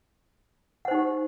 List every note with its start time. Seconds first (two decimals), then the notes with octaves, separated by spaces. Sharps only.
0.85 F#5
0.88 C5
0.91 D#4
0.94 G4